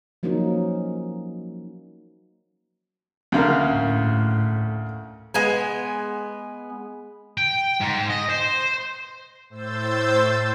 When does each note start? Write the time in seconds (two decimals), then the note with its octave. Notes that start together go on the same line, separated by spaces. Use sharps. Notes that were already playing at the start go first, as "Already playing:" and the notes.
0.23 F3 F#3 A#3 C#4 D#4
3.32 D2 C#3 A#3
3.71 A2
5.34 G#3 B3 G#5
7.37 G5
7.81 G#2
8.10 D#5
8.29 C5
9.50 A2 C5 E6 G6 A6